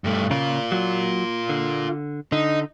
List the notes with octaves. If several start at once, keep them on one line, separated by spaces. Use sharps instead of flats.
G2 A3
C#3 F4 A#4
F#3
D3
D3 D#4